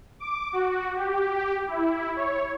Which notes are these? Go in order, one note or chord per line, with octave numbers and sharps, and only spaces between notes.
D6
F#4
G4
E4
C#5